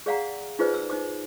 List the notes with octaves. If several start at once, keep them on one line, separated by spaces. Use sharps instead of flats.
G#4 D5 F5 F#5 A#5
D#4 F4 G#4 B4 C5 D5
E6
D#4 C5 D6